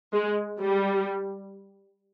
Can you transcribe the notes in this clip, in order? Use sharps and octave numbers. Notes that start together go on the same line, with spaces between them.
G#3
G3